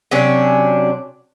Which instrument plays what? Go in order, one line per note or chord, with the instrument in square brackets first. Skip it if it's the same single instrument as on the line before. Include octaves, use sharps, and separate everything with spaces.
[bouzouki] C3 F#3 C#4 D4